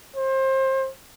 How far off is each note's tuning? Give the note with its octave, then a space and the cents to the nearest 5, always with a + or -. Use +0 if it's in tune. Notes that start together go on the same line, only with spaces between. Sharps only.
C5 +30